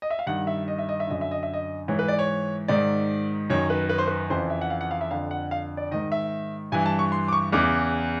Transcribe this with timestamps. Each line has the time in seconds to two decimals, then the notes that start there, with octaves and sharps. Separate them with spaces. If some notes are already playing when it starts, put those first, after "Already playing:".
0.02 D#5
0.10 E5
0.19 F5
0.27 G2 D#3 F#5
0.47 E5
0.68 D#5
0.79 E5
0.89 D#5
1.00 E5
1.07 F#2 D3 D#5
1.21 E5
1.31 D#5
1.43 E5
1.54 D#5
1.88 G#2 E3 C#5
1.99 B4
2.08 D5
2.19 C#5
2.68 G#2 D#3 D5
3.50 F#2 D#3 C#5
3.70 B4
3.89 B4
3.98 C5
4.07 B4
4.30 F2 C#3 E3 C5
4.50 E5
4.61 F#5
4.70 F5
4.81 F#5
4.91 F5
5.01 E5
5.11 F2 D3 F5
5.31 F#5
5.51 F5
5.77 D5
5.91 G#2 D#3 D#5
6.12 E5
6.72 G2 E3 G#5
6.86 A5
6.99 C#6
7.12 C6
7.28 D6
7.33 C#6
7.52 E2 C#3 E3 D6